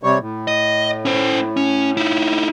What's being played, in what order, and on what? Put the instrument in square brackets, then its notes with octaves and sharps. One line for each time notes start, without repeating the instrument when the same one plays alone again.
[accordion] C3 G3 C#5
A2
[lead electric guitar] D#5
C#4 C5
C#4
D#4 E4